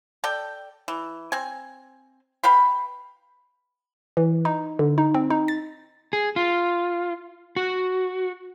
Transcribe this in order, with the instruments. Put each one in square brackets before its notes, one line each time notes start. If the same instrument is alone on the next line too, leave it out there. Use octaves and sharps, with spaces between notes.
[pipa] A4 D5 G5
E3
C4 G#5
B4 F5 G5 B5
[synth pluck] E3
D#4
D3
D#4
C4
D#4
A6
[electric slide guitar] G#4
F4
F#4